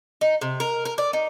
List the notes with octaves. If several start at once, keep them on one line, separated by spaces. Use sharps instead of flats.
D#4
C3
A#4
A#4
D5
D#4